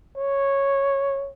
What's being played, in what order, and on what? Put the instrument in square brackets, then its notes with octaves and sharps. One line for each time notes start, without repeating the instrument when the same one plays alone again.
[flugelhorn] C#5